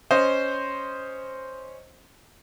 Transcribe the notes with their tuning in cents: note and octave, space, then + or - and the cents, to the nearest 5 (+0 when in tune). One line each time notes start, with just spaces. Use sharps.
C#4 +0 C5 +0 D#5 +0